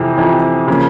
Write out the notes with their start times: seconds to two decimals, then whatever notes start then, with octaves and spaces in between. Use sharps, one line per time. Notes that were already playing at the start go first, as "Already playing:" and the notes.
Already playing: F2 C3 E3
0.17 F2 C3 E3
0.67 C#3 F3 A#3